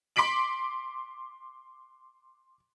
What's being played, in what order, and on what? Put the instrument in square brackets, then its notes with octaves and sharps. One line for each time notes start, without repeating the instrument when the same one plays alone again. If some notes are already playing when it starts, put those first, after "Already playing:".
[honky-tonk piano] C6 D6 B6 D7 F#7